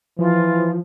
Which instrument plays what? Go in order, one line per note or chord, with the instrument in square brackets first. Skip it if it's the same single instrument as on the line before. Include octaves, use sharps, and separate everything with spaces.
[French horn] E3 [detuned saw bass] F3 [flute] F4